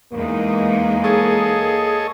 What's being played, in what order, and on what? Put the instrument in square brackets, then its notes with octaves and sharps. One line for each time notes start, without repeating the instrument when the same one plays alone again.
[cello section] E2 G#3 D#4 [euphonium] A#3
[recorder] G#4 [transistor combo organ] A4 C#5 D#5